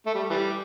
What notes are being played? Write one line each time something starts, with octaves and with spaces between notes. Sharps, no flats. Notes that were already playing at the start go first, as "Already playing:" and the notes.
A3
G3
E3 G3